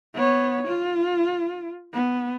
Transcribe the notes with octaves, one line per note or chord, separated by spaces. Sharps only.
B3 C#5
F4
B3